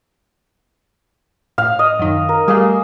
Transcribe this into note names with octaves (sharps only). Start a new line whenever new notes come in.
A2 F5
D#5
F#2 D#3
A#4
G3 A3 A#3 G#4